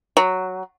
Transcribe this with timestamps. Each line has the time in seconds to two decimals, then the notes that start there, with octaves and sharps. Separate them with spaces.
0.17 F#3